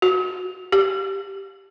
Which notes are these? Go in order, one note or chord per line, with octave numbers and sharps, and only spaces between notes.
F#4
G4